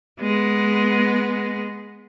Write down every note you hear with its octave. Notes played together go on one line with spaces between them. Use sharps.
G#3 B3